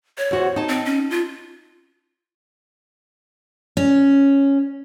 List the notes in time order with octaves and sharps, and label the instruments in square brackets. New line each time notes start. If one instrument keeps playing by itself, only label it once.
[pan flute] C#5
[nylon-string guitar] E2 F#4 C5
D#4 A5
[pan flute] C4
C#4
F4
[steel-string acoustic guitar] C#4